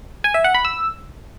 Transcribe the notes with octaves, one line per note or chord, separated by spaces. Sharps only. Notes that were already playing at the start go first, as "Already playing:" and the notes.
G#5
E5
F#5
B5
E6